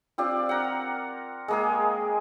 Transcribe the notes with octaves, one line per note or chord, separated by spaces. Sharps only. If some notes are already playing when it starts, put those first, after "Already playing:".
C4 F4 G4 D5
A#4 F#5
G#3 A#3 G#4